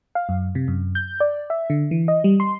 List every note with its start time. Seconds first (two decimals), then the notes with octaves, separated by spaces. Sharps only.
0.15 F5
0.29 F#2
0.55 C3
0.68 F#2
0.95 G6
1.20 D5
1.50 E5
1.70 D3
1.91 E3
2.08 D#5
2.24 G3
2.40 C6